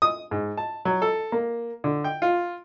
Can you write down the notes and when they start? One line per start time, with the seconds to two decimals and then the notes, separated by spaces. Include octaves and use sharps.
0.02 D#6
0.31 G#2
0.57 A5
0.85 F#3
1.02 A4
1.32 A#3
1.84 D3
2.04 G5
2.22 F4